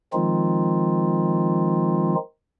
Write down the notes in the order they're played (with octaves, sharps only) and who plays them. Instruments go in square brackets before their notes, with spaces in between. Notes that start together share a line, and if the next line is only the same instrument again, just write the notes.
[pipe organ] D#3 F3 G#3 C4 D#4 F4